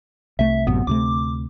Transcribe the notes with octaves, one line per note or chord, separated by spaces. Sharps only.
C2 A3 E5
A1 F#2 C3 B3
D2 C3 A3 D6